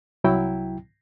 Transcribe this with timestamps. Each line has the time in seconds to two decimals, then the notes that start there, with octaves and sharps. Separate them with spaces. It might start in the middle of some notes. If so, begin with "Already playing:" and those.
0.24 C2 F#3 E4 G5